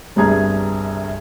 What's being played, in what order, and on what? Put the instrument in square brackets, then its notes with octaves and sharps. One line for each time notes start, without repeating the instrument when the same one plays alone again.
[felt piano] G1 C2 G2 G#4 A#5 G#6